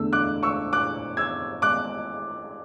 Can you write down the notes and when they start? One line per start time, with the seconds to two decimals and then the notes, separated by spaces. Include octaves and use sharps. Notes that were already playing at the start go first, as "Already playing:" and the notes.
Already playing: E2 D3 A3 E6
0.13 D6 F#6
0.43 C#6 E6
0.73 D6 F#6
1.17 E6 G#6
1.62 D6 F#6